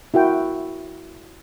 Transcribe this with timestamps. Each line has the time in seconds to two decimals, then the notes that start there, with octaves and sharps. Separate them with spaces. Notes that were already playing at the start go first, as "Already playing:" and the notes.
0.14 E4 F#4 A#4 G5